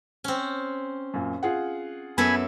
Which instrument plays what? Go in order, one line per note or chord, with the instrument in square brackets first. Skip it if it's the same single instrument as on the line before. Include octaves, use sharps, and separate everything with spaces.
[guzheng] C4 C#4
[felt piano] F#2 A#2
F4 G#4 F#5
[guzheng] F#2 E4 A4 [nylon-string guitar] B3 [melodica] G#5 B5